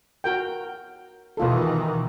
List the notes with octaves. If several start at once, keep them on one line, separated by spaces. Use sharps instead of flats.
F#4 A#4 G5
B2 D#3 E3 F4 A4